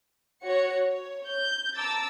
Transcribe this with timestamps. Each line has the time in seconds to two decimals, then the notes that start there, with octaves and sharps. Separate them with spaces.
0.42 F#4 C#5 C#7
0.85 C#5
1.25 G6
1.76 A5 A#5 D6 E6 A6